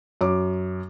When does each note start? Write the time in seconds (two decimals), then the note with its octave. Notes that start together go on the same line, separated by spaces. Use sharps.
0.21 F#2 D6